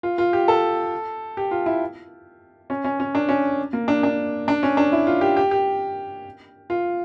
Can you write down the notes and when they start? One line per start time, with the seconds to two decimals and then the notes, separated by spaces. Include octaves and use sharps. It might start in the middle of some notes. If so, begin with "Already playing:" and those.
0.03 F4
0.18 F4
0.33 G4
0.48 A4
1.37 G4
1.51 F4
1.66 E4
2.70 C#4
2.84 C#4
3.00 C#4
3.15 D4
3.29 C#4
3.73 A#3
3.88 D4
4.03 D4
4.48 D4
4.63 C#4
4.77 D4
4.92 E4
5.07 F4
5.21 G4
5.37 G4
5.51 G4
6.70 F4